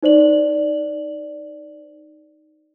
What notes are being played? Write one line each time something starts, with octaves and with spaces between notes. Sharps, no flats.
D#4 C5 D5 F#7